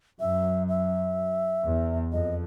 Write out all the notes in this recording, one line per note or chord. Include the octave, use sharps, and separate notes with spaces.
F#2 E5
E5
E2
F2 D#5